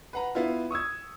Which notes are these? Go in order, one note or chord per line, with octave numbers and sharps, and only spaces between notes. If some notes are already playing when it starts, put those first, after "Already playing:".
B4 F#5 A#5
B3 E4 F4
C#6 D#6 E6 G#6